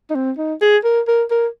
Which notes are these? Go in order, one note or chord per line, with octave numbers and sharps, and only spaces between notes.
D#4
C4
D#4
G#4
A#4
A#4
A#4